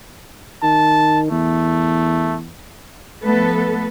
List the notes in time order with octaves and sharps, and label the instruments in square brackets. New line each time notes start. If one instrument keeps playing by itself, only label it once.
[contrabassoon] D#3 [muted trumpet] A5
[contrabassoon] E2 [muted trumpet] A3
[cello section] F3 A3 B3 A4 B4